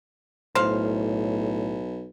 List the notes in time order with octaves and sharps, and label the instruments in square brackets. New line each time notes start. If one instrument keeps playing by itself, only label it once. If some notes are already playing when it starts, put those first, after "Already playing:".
[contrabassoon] B1 [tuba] A2 [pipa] C5 F5